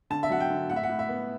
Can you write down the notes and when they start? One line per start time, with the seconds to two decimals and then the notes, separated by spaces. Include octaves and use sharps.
0.10 D3 A5
0.23 E5
0.30 F#3 F#5
0.40 G5
0.50 D3
0.69 A2 F#5
0.76 E5
0.83 F#5
0.89 A2
0.99 E5
1.09 B3